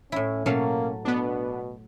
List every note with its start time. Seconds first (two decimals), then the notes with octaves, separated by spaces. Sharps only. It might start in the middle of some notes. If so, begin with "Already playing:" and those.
0.12 A2 C#4 E4
0.46 B2 F#3 A#3 C#4 A4 F5
1.05 B2 B3 D4